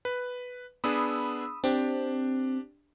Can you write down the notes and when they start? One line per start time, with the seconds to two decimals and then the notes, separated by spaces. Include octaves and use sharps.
0.05 B4
0.84 B3 D4 G#4 B5 D#6 E6
1.64 C4 D4 G4